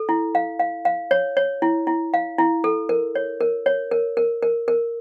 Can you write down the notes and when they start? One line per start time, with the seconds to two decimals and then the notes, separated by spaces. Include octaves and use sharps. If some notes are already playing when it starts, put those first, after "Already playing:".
Already playing: A4
0.09 E4
0.35 F5
0.59 F5
0.85 F5
1.11 C#5
1.37 C#5
1.62 E4
1.87 E4
2.14 F5
2.39 E4
2.64 A4
2.89 A#4
3.15 C#5
3.40 A#4
3.66 C#5
3.91 A#4
4.17 A#4
4.42 A#4
4.68 A#4